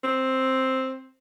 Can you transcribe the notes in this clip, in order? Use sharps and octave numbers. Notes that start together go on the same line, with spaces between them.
C4